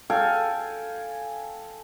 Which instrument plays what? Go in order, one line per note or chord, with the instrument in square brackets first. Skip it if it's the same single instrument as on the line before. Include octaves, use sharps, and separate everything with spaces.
[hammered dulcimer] A4 F5 G5 G#5